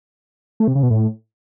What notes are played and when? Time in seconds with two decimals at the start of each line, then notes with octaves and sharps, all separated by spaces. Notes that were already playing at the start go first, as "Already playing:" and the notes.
0.60 A3
0.68 C3
0.75 C#3
0.83 B2
0.90 A2